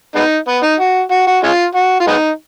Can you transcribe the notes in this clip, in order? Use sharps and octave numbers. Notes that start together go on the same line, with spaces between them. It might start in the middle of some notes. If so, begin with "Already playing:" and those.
G#3 B3 D#4
B3
D#4
F#4
F#4
F#4
G#3 C#4 F4
F#4
F4
G#3 B3 D#4